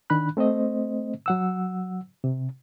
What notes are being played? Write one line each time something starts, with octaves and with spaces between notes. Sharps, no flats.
D#3 D4 B5 F#6
A3 C4 C5 D#5
F#3 F#5 E6
C3